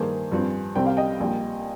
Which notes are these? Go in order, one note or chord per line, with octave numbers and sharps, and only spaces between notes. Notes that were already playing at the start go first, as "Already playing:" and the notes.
Already playing: G2 D#3 A#3 G#4 C5
G2 F3 C4
C2 C3 G3 C4 G5
F5
D#5 G5
A#1 A#2 G3